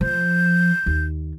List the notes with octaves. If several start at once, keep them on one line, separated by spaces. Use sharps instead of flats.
F3 G6
D#2